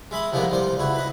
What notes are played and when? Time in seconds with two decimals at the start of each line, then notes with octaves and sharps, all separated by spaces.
0.11 G#3 E5 B5 D#6
0.32 C2 G2 F3 G#3 A#3 B3
0.50 C2 G3 C5
0.78 C#2 E4 F#4
0.95 B4 D#5